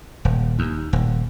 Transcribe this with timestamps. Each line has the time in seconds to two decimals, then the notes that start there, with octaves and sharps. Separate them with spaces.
0.25 D#1
0.59 D#2
0.93 D#1